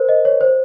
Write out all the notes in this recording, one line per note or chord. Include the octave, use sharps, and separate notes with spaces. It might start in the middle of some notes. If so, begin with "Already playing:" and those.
Already playing: A#4 C5
D#5
C#5
C5